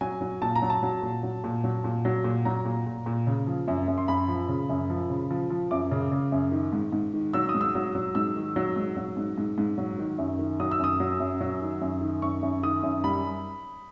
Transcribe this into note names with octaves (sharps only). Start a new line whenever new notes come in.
F#3 G#5
F#3
A#2 A5
A#5
F#3
A5
F#3
A#2
F#3
A#2
F#3
A#2
F#3
A#2
F#3 A#5
A#2
A#2
A#2
C#3
F3
F#2
F#2
C6
F#2 B5
F3
C#3
F#2
F3
C#3
F3
F3
F#2 D6
C#3
C#3
F#2
D#3
G#2
G#2
D#3
F#3 E6
D#6
G#2
E6
F#3
F#3
G#2 E6
D#3
F#3
G#2
F#3
G#2
G#2
G#2
F#3
D#3
F#2
D#3
F#3 D#6
E6
F#2 D#6
F#3
F#2
F#3
D#3
F#2
D#3
F#2 C#6
F#2
D#3 D#6
F#2
G3 B5